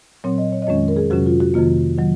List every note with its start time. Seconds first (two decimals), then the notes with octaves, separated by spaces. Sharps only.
0.24 A#2 F#3 C4 C#5
0.38 D#5
0.52 C#5
0.62 D#5
0.67 F2 D#3 G#3 C#4 C#5
0.88 A#4
0.97 G#4
1.10 F2 C3 F#3 C#4 F#4
1.26 F4
1.40 F#4
1.54 F2 C3 D#3 A#3 F4
1.98 D#3 F#3